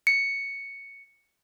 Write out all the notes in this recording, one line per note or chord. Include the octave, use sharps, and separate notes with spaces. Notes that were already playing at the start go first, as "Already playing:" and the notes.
C#7